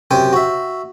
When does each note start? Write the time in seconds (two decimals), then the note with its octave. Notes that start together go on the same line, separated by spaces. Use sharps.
0.11 F#2 C3 C5 G5 G#5
0.33 F#4 E5